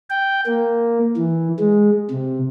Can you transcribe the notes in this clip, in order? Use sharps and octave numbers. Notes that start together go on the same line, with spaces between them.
G5
A#3
E3
G#3
C3